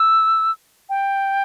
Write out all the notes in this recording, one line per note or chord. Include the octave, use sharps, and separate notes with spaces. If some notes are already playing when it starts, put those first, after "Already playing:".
Already playing: E6
G5